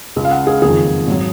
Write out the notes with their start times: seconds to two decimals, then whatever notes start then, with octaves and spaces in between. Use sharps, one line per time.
0.16 C#2 C#3 G#3
0.25 F5
0.31 F#5
0.47 G#4
0.62 F#1 F2 D#3 G#4
1.07 G#1 F#3